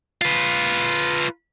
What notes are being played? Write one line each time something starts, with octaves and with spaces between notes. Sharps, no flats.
F4 B4